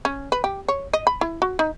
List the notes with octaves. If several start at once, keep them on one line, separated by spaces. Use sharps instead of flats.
C#4
B4
G4
C#5
D#5
B5
E4
F#4
D#4